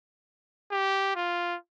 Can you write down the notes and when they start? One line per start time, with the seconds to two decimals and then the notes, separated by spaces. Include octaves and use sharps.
0.71 G4
1.16 F4